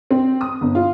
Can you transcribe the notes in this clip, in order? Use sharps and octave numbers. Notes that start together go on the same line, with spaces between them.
C4
D#6
G1
F4